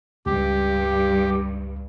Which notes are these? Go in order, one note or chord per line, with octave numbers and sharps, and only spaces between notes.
C#2 G2 G4